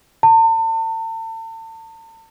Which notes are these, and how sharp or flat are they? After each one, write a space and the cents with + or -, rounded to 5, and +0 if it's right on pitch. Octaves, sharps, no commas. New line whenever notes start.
A5 +40